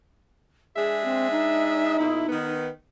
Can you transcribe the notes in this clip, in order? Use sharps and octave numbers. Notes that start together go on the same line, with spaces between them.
G#3 D4 G#4 E5
C4
D#4
E2 A#2 E4
D#3 B3